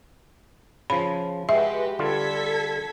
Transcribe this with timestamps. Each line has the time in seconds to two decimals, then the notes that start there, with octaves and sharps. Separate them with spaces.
0.90 C#3 F3 B5
1.49 G#3 F#4 G4 B4 E5
1.99 D3 G3 F4 A4 G#6 B6